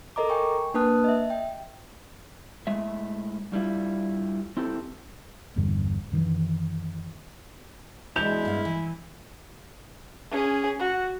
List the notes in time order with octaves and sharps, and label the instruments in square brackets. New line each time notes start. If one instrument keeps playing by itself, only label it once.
[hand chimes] A4 A#4 D#5 A#5 D6
G5 G#5 C#6
A#3 D4 B4 A5 D#6 F#6
D#5 E5
G5
[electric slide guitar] A2 G#3 E5
G2 G3 A3 E4 F4
C4 E4 G4 A4
[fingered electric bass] G1 E2 G2 D3
F#2 D#3 E3
[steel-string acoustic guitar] B2 E3 D4 [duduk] G#3 [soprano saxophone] E4 [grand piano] G6 F7
[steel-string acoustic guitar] G2 B3 F5
E3
[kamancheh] C#4 G#4
F#4